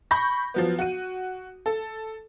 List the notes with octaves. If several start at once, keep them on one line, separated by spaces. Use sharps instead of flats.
B5 C#6 G6 A#6
F3 F#3 B3
F#4 D#7
A4